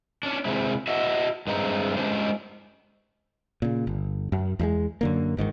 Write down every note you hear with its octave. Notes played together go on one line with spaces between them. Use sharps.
C#4 D4
C3 G#3 C4 E4
F#4 D#5 E5 F#5
G2 G#3 A3 C4 A#5
G#3 C#4 D4 G4 C5
A#2 C#3
G1
F#2
E2 G3 G#3
F#2 D3 A#3
G1 G#2 C3 D#3